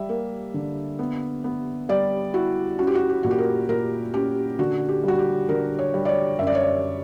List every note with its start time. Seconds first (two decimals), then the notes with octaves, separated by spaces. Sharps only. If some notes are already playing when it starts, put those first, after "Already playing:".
Already playing: G3 E5
0.09 A#3
0.54 D3
0.99 B3
1.44 B3
1.89 G3 D5
2.34 E4 F#4
2.79 C#4 F#4
2.87 G4
2.95 F#4
3.09 G4
3.23 A#2 F#4
3.31 G4
3.39 A#4
3.69 A#2 A#4
4.14 C#4 G4
4.59 D3 F#4
4.89 G4
5.04 G3 F#4
5.19 G4
5.49 D3 A#4
5.79 C#5
5.94 G3
6.05 D5
6.09 C#5
6.39 F#2 E5
6.47 D5
6.55 C#5
6.63 D5